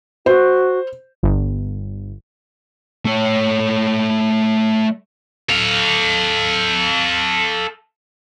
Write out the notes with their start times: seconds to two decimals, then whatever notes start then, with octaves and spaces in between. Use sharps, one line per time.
0.26 F#4 C5
1.23 G1
3.05 A3 C#5
5.49 A4 F5